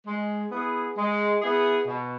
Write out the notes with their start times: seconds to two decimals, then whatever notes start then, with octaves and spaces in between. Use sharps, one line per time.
0.07 G#3
0.51 B3 E4 G#4
0.97 G#3
1.42 B3 E4 G#4
1.87 B2